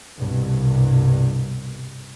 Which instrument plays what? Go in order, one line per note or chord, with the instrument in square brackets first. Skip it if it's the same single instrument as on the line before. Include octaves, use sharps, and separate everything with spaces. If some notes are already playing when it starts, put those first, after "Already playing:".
[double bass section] C2 G2 B2